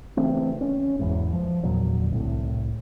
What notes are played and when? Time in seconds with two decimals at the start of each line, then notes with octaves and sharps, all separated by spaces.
0.17 C#3 E3 A3 C4
0.61 C#4
0.99 F#1 E2 G#2
1.33 F3
1.63 E2 A#2 D3 F#3
2.12 C2 A2